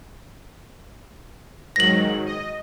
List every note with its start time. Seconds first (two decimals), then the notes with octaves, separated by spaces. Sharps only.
1.76 G#2 D#3 F#3 A#6 F#7
2.26 D#5